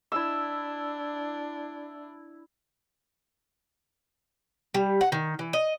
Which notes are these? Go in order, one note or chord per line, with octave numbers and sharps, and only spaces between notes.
D4 E4 E6
G3
F#5
D#3
E3
D#5